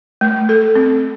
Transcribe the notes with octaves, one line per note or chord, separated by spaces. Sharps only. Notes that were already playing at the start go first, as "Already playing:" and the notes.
A3
A4
C4